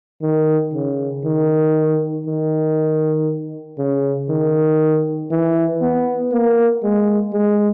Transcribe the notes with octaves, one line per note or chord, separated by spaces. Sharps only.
D#3
C#3
D#3
D#3
C#3
D#3
E3
B3
A#3
G#3
G#3